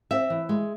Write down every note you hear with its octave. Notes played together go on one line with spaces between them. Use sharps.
C4 E5
E3
G#3